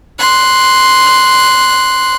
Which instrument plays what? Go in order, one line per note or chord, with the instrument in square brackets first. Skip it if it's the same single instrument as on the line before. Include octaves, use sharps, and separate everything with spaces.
[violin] C6 F#6